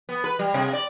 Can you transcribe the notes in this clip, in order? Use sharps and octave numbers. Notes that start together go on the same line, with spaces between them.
B3
B4
G3
C3
D5